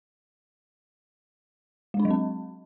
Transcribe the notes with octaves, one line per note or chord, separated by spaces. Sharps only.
G#3
D4
F#3
C4